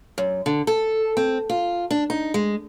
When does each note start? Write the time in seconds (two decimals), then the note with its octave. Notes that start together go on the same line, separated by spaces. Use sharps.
0.18 F#2
0.46 D3
0.67 A4
1.17 C4
1.50 F4
1.91 D4
2.10 D#4
2.34 G#3